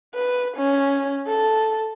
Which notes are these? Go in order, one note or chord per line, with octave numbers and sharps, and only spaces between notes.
B4
C#4
A4